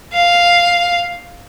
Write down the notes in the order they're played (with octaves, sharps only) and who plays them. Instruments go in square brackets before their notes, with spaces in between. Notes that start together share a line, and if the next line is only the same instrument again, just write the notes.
[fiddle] F5